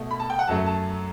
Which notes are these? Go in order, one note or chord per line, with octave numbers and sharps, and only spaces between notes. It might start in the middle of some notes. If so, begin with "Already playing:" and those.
Already playing: B2 A3
B5
A5
G5
F#5
F#2 F#3 A3 A5
A5